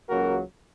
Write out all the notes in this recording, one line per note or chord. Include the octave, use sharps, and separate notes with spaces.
C#2 C#3 F#3 A#3 F#4 A#4